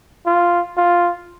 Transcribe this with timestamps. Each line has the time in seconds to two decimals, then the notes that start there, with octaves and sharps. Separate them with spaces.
0.26 F4
0.77 F4